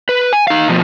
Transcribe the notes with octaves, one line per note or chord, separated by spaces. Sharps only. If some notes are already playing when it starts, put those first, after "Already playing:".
B4
G#5
D#4 F5
B2 F3